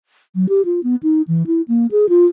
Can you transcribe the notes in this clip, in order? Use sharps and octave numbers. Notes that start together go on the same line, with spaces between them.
F#3
G4
F4
B3
D#4
E3
E4
A#3
G#4
F4